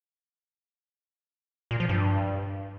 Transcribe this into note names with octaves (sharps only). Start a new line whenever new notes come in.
A#2
F3
G2